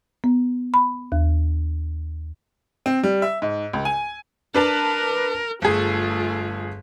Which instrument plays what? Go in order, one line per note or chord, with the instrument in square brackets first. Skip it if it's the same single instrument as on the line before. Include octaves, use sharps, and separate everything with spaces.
[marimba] B3
B5
D#2
[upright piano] C4
G3
E5
G#2
C#2
G#5
[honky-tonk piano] D4 B4 A5 [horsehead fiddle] A#4
[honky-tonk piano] G1 G#4 [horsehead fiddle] A3 F4